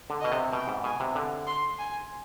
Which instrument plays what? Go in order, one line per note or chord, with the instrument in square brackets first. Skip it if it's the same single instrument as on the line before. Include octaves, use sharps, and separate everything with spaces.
[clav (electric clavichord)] D3
[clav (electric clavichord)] B2 [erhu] D#5
[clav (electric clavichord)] C3
[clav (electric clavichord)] B2 [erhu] G5
[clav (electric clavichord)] G#2
[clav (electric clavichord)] B2 [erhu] G#5
[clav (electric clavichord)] C3
D3
[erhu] C6
G#5